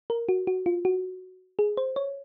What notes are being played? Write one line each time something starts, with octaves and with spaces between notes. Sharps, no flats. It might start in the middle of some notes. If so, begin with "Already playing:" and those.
A#4
F#4
F#4
F4
F#4
G#4
C5
C#5